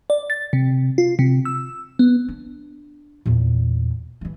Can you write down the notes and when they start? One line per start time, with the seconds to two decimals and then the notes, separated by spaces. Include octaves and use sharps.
0.10 D5
0.30 A6
0.53 C3
0.98 F4
1.19 C3
1.45 E6
1.99 B3
2.28 D4
3.26 E2 A#2
4.21 E3 A3